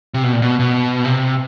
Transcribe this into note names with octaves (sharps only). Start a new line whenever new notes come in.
C3
B2
A#2
B2
B2
C3